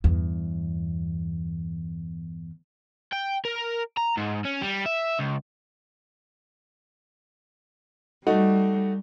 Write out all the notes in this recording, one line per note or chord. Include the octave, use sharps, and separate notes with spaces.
E2 G2
G5
A#4
A#5
G#2
C#4
G3
E5
C#2
G3 A3 D#4 F#4